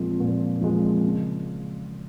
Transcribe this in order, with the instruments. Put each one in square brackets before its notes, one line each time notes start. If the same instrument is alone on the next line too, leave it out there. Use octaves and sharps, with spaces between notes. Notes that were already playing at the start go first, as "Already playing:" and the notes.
Already playing: [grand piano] A#2 F3 G#3 C4
A#2
F3 G#3 C4
C#3